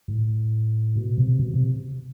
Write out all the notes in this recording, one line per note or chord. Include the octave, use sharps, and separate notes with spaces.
A2
B2
C3
B2
C3